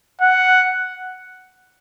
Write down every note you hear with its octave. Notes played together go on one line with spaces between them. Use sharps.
F#5